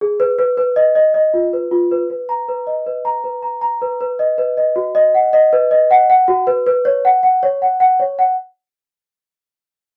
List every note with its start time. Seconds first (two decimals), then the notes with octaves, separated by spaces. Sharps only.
0.01 G#4
0.20 B4
0.39 B4
0.57 B4
0.76 D#5
0.95 D#5
1.14 D#5
1.34 F4
1.53 B4
1.71 F4
1.91 B4
2.10 B4
2.29 A#5
2.49 B4
2.67 D#5
2.86 B4
3.05 A#5
3.24 B4
3.43 A#5
3.61 A#5
3.82 B4
4.01 B4
4.19 D#5
4.38 B4
4.57 D#5
4.76 F#4
4.95 D#5
5.14 F#5
5.33 D#5
5.53 B4
5.71 D#5
5.91 F#5
6.10 F#5
6.28 F#4
6.47 B4
6.66 B4
6.85 C#5
7.05 F#5
7.23 F#5
7.43 C#5
7.62 F#5
7.80 F#5
7.99 C#5
8.19 F#5